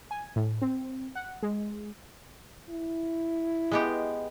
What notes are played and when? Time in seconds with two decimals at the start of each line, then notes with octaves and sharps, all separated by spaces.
0.11 G#5
0.36 A2
0.62 C4
1.15 F#5
1.43 G#3
2.69 E4
3.71 G#3 B3 G4